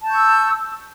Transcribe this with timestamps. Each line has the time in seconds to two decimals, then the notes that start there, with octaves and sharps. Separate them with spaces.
0.01 A5
0.06 G6
0.11 C#6
0.15 E6